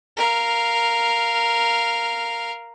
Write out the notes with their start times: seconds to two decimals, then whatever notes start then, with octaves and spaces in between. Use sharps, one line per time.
0.17 A#4 F5